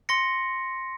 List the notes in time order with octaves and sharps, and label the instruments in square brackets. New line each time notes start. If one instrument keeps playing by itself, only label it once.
[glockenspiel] C6 A#6 C#7